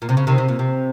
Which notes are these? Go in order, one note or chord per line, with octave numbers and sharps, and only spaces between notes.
A#2
C3
C#3
C3 D#3
C3
A#2
C3